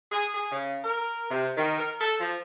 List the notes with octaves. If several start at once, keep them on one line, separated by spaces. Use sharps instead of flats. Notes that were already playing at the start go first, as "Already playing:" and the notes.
G#4
G#4
C#3
A#4
C3
D#3
A#4
A4
F3